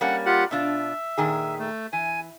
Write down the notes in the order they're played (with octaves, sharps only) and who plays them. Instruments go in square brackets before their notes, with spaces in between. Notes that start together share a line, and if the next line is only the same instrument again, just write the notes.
[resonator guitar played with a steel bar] G3 A#3 C#4 [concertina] F#5
[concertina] F4 G4 F#5
[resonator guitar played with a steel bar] B2 D4 F4 [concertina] E5
[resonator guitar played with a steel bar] A#2 D#3 G#4
[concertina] A3
[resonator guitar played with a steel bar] E3 [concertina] G#5